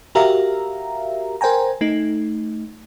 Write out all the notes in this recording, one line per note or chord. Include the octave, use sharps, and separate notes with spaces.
F#4 G4 A#4 E5 F5 A#5
A#4 C5 G5 G#5 A#5
A3 D#4